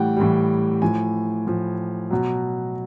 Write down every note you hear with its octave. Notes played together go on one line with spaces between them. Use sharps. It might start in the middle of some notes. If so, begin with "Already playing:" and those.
Already playing: A2 E3 G3 F#5 G5
A2 E3 G3
A2 F3 G#5
A2 F3
B2 F#3